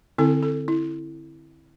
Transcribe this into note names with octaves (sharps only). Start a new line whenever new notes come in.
D3 C4 E4 A4
A4
E4